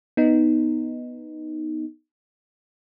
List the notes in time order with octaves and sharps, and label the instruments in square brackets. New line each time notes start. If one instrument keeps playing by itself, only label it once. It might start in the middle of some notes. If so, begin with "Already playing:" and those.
[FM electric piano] B3 D#4